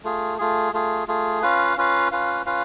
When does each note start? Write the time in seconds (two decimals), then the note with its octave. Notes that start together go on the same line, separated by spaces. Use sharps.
0.04 A3 F4 G#4
0.38 A3 F4 G#4
0.73 A3 F4 G#4
1.08 A3 F4 G#4
1.43 C#4 F4 B4 F5
1.77 C#4 F4 B4 F5
2.11 C#4 F4 B4 F5
2.46 C#4 F4 B4 F5